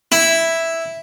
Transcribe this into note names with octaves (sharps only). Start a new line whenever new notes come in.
E4